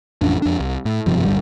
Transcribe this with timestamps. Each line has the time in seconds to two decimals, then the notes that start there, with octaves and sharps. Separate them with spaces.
0.21 A1 F2 C#4 D4
0.42 F2 D4
0.60 C2
0.85 A2
1.06 F#1 G2 C3 F3
1.25 D1 G1 G3